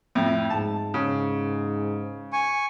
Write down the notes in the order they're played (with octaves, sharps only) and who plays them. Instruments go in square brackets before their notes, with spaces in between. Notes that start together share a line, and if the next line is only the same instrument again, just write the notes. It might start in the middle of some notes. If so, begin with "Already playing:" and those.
[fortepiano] F2 A2
[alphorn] G#2 [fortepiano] A5
[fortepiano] C#3
[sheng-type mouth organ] G#5 C#6